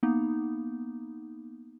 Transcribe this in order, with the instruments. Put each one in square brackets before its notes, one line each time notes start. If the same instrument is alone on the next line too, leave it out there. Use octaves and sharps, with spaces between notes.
[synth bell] A#3 B3 D#4